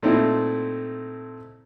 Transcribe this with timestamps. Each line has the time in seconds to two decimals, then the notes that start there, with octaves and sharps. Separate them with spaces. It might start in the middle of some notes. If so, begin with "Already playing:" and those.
0.03 A#2 A3 C4 D#4 E4